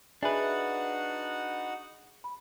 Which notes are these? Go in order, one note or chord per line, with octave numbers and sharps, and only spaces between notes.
D4 D#4 F#4 G#4 B4 E5 F#5 G#5
B5